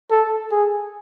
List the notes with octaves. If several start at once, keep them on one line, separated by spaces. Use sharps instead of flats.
A4
G#4